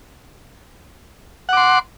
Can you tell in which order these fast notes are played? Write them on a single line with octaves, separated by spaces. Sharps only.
F#5 D6 C6